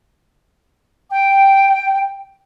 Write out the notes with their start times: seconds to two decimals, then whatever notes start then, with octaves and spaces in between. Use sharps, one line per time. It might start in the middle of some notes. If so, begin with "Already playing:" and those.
1.10 G5